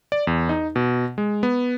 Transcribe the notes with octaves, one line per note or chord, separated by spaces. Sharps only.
D5
E2
D#4
B2
G#3
B3